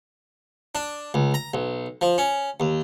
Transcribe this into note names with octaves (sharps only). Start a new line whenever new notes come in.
D4
C#2
A#5
B1
F3
C#4
D#2